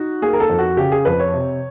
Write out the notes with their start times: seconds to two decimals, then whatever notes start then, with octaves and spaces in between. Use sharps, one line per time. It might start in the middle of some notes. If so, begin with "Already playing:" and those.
Already playing: D#4 F#4
0.22 A#3 G#4
0.33 A#4
0.40 A4
0.50 F2
0.58 F#4
0.77 C#3 G4
0.92 G#4
1.05 F2 B4
1.20 C#5
1.33 C3